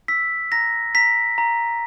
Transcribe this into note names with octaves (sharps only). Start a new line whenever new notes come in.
E6 B6
A#5 A#6
A#5 B6
A#5